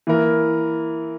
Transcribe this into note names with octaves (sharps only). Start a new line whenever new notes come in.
E3 A#3 E4 A#4